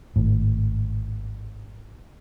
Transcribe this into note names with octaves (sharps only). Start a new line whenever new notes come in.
G#1 A2